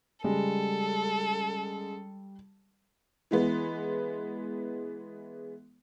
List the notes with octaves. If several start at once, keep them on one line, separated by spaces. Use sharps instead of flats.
C#3 G3 G#3 A4
E3 G#3 B3